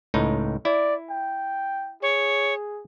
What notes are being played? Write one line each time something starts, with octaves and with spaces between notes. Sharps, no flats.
C#2 A2 D#4
E4 D5
G5
G#4 C#5